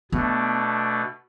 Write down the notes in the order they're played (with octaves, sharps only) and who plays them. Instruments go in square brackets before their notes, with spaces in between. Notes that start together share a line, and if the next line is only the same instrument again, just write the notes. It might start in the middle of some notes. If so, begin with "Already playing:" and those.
[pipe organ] B2 A3 D4 [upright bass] B3